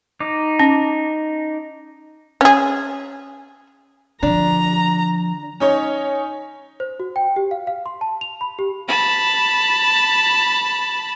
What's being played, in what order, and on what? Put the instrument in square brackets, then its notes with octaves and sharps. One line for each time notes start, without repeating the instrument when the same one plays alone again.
[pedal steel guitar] D#4 D6
[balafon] C#4
[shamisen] C#4 G#4
[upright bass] D3 F3 [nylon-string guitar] D4 [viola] A#5
[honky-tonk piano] C#4 D#4 C#5
[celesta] C5
F#4
G5
G4
F5
F5
C6
A5
F7
B5
G4
[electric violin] A5 B5